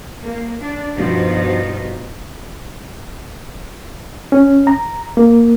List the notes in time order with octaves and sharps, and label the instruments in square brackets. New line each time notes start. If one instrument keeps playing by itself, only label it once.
[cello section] A#3
D4
G2 B2 F3 D#4
[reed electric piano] C#4
A#5
A#3